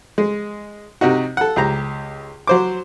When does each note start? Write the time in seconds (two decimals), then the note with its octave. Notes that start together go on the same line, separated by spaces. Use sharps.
0.18 G#3
1.01 C3 D#4 F#4
1.37 A4 F#5
1.56 C#2 G4 A#5
2.47 F#3 C5 D6